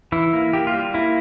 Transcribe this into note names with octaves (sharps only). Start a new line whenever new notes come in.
E3 E4
A#3
A#3 G4
F4
G3
A#3 E4